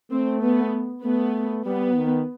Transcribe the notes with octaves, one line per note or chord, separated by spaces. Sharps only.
A3 C4
B3
A3 B3
G3 B3
D#3